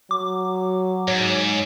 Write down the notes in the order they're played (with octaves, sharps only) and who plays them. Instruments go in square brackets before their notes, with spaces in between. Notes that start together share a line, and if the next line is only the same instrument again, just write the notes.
[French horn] F#3 [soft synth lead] D6
[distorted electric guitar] G#2 [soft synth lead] C#5